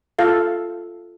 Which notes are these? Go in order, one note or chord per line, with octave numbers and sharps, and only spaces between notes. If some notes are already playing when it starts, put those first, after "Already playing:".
F4 A4 F5